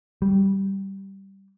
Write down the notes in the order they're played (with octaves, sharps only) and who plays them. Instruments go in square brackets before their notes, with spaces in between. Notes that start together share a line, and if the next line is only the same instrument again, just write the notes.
[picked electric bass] G3